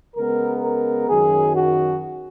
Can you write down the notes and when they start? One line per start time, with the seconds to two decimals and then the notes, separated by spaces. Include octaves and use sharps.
0.16 C#3 G#3 B3 A#4
0.62 A#4
1.09 F#2 D#3 F#3 G#4
1.54 F#4